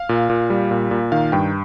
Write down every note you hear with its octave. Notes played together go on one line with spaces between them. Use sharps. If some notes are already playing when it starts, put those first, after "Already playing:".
Already playing: F5
A#2
A#2
G3
A#2
A#2
D#3 F5
G2 G5